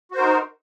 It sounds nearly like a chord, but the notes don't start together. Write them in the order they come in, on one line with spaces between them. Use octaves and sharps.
F#4 C5 A#4 D#4